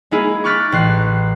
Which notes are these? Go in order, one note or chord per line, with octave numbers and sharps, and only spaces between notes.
G#3 A#3 D#4 E4 G#4
C#6 D6 F6 F#6 A6 B6
A1 F#6 C7